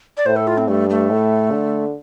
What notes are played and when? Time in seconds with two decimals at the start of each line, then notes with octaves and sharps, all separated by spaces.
0.17 D5
0.26 A2 C5
0.36 A4
0.47 F4
0.58 C4
0.68 G2 A3
0.90 A3
1.11 A2
1.52 D3